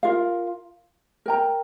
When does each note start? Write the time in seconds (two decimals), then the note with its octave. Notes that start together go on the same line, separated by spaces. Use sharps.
0.03 F4 A#4 F5
1.26 A#4 G5 A#5